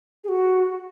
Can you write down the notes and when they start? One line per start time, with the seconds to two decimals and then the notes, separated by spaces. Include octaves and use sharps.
0.24 G#4
0.29 F#4